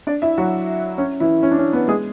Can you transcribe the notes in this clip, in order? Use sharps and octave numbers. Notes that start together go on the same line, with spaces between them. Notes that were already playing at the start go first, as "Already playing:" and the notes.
D4 D5
E4 E5
F#3 F#4
C#4
E3 E4
C#4
D4
C#4
B3
G#3 G#4